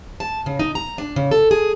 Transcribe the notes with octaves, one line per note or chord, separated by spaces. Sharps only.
A5
C#3
D#4
A#5
D4
C#3
A4
G#4